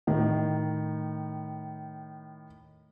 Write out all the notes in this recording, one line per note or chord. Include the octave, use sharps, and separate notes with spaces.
A2 D#3